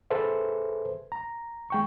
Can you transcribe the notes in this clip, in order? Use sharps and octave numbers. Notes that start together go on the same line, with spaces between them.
G#4 A4 B4 C5 E5
A#5
G#3 G5 C#6